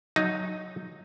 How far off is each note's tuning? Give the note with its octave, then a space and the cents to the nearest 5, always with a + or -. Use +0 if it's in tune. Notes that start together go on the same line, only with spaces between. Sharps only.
F#3 +0 D#4 +0